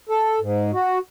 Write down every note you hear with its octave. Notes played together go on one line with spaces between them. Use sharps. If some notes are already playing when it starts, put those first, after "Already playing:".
A4
G#2
F#4